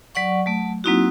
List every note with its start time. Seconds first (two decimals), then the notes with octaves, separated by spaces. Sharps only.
0.15 F#3 D5 F#5 C#6
0.46 F#3 A3
0.84 F#3 A#3 C4 D#4 E4 F#4